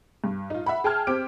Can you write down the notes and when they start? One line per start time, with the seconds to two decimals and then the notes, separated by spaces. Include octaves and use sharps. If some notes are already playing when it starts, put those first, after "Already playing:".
0.24 G2
0.50 D#4 F4
0.66 E5 F#5 B5
0.84 G#4 G5 A5 F6 G#6
1.07 C4 G4 D6 G6 D7